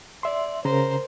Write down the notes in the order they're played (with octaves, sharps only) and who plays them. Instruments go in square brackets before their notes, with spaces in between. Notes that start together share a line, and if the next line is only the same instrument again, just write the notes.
[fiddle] D5 [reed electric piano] E5 C6
[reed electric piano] C#3 A#5 [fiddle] A#4 C5